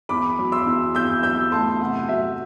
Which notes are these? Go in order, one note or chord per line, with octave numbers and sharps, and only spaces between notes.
E2 B5 D6
F#3
C6 E6
E2
E2 E6 G6
F#3 E6 G6
A3 A5 C6
C3 F#5
F#3 E5